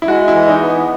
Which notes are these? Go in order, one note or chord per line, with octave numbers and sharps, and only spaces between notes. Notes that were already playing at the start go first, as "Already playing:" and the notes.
E4
G#3 F#4
E4
E3
D#4
B3